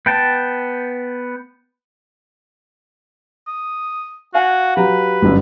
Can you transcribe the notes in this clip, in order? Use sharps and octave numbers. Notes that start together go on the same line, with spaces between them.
B3 G5 A5
D#6
F#4 F5 F#5 G#5
F#3 G4 B4 A#5
G1 F#2